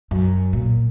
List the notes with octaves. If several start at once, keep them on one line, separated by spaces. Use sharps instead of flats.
F#2
A#2